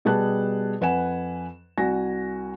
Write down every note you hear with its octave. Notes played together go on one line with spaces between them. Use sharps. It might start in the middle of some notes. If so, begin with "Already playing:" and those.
B2 G3 G#4 A5 F#6
F2 B4 F#5 G#5 E7
C2 F#4 G#5 A#6